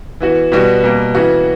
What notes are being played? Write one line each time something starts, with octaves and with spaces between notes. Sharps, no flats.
E3 B3 F#4
B2 G3 B3 F#4
B2 G3 A#3
C#3 E3 B3 F#4